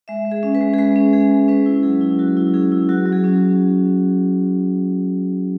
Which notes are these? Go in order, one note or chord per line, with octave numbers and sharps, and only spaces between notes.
G#3 E5
G#3
G#4
C#4
B4
G#3
G#4
G#3 B4
C#4
G#3 G#4
G#3
C#4 B4
E4
F#3 G#4
E4
F#3 F#4
E4
C#4 G#4
E4
F#3 F#4
F#3
G#4
C#4